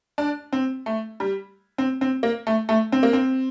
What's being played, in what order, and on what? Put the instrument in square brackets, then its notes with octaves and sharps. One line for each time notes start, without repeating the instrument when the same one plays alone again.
[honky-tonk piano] D4
C4
A3
G3
C4
C4
A#3
A3
A3
C4
A#3
C4